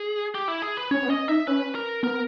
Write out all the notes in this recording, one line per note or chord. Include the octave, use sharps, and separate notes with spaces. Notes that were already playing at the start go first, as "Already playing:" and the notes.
Already playing: G#4
G4
E4
G#4
B4
C#4 C#5
B3
C#4 D#5
D#4 E5
C#4 B4
A#4
B3 A#4